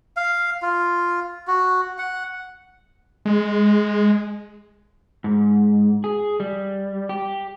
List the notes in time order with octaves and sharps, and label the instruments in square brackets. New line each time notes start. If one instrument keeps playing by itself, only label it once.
[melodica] F5
F4
F#4
F#5
[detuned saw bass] G#3
[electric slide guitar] G#2
G#4
G3
G4